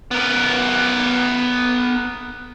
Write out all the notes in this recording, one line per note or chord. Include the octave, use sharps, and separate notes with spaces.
B3 A#4